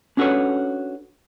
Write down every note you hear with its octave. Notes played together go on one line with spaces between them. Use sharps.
C#4 D4 F#4 A4 B4 C#5